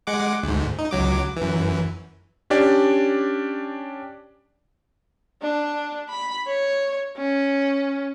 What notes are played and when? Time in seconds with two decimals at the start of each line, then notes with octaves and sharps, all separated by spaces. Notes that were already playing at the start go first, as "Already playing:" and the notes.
0.07 G#3 F#5 D6
0.43 D2 G#2
0.79 D#4
0.91 C#2 F#3 D6
1.37 F#2 E3
2.50 C#4 D4 G4 D5
5.42 D4
6.09 B5
6.47 C#5
7.17 C#4